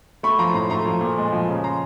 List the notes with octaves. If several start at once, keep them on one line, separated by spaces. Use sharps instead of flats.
A3 B5 C#6
F3 A#5 C6
A2 A#5 C6
A3 A#5 C6
F3
A#2
G#3
F3
C#3
A#5 C6